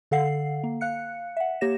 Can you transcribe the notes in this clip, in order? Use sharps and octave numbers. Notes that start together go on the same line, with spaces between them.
D3 A4 F5 F#5 C7
A#3
F5 F#6 C#7
E5 F#5
A#3 G4 C#5 A#6 E7